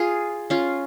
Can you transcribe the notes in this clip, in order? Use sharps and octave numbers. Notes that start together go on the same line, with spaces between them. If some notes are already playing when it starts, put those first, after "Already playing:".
Already playing: F4 G#4
C#4 F4